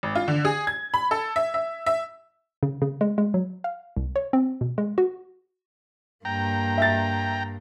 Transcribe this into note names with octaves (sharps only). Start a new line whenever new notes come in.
G#1
F4
D3
G#4
G#6
B5
A4
E5
E5
E5
C#3
C#3
G#3
G#3
F#3
F5
C2
C#5
C4
B2
G#3
F#4
G2 A#3 G5 A#5
E5 A6